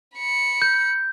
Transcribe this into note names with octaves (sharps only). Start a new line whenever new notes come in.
B5 C#7
G6